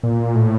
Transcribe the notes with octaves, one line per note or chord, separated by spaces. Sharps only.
A#2
A2